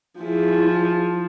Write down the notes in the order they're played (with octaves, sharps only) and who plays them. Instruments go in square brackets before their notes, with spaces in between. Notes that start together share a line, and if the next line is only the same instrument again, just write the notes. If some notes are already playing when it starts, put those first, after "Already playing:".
[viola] F3 [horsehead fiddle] E4 G#4